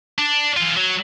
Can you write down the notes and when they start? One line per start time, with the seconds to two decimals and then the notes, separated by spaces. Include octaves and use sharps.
0.18 D4
0.57 E3 F4
0.77 F#3